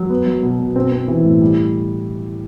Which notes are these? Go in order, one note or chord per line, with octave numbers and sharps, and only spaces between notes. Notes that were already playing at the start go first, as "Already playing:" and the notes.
Already playing: F#3
B3
F#3
B2
B2
C4
C4
E3
A2
G3